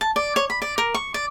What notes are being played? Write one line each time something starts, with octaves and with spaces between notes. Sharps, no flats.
A5
D5
C#5
B5
D5
A#4
C#6
D5